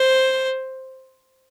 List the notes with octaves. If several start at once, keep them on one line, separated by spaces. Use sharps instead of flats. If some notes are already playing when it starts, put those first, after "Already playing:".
Already playing: C5